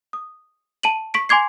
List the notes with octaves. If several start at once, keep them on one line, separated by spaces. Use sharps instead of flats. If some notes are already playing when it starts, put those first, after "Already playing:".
D#6
A5 D#7 F#7
C#6 B6 D7
G#5 C6 D6 G#6 C7